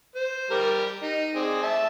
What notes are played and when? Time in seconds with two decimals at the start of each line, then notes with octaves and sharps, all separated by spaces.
0.15 C5
0.50 G3 G4 A#4
1.03 D#4
1.35 C4 G#4 D5
1.63 E5 A5